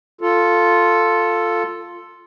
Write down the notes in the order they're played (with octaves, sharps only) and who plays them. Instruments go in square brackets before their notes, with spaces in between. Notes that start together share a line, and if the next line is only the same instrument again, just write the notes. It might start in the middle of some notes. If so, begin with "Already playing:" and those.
[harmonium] F4 A4